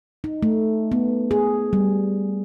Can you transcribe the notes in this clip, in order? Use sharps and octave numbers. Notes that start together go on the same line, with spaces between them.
D#4
A3
B3
G#4
G3